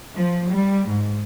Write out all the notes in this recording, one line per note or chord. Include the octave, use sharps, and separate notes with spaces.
F3
G3
G#2